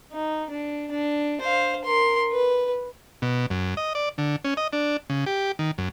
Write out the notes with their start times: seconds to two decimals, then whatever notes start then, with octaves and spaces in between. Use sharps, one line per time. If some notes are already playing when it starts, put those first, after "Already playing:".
0.12 D#4
0.50 D4
0.91 D4
1.41 C5 F5
1.84 A#4 C6
2.32 B4
3.22 B2
3.50 F#2
3.77 D#5
3.95 D5
4.18 D3
4.44 C#4
4.57 D#5
4.73 D4
5.10 C#3
5.26 G4
5.59 D#3
5.78 F#2